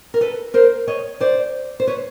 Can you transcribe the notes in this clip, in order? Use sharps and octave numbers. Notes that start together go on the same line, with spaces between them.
A#4
A4 B4
A#4 C5
C#5 D#5
C5 D5
C5
B4 C#5